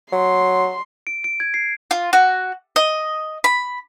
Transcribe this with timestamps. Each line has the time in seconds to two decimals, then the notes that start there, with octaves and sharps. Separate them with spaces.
0.12 F#3 C6
1.07 D7
1.24 D7
1.40 G#6
1.54 C7
1.91 F4
2.13 F#4
2.76 D#5
3.44 B5